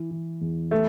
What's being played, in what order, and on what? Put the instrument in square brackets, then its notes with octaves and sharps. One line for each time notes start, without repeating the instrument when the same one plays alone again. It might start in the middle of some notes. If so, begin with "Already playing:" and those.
Already playing: [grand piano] E3
E3
E2
[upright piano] A3